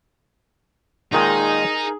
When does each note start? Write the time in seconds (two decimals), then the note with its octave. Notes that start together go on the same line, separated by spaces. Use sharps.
1.13 A#2 D#3 G#3 D#4 G#4 A#4